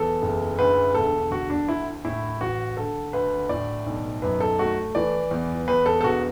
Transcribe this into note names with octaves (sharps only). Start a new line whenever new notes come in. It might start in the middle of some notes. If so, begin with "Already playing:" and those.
Already playing: E2 A4
F#1
D2 B4
E1 A4
D3 F#4
D4
D2 E4
A2 E4
A1 F#4
D3 A4
D2 B4
A2 D5
B1
F#2 B4
A4
A3 F#4
E3 D5
E2
E2 B4
A4
A4
E1 F#4